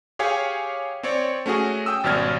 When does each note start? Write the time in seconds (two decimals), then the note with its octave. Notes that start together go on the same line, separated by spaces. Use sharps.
0.19 G4 G#4 C#5 F5 G#5
1.03 C4 C#5 D5
1.46 A3 C#4 F#4 G#4
1.86 G5 D#6 E6
2.04 G#1 B2 G3 C#4 F6 G#6